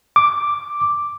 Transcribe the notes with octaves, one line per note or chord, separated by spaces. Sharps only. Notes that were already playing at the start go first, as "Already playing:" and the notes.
D6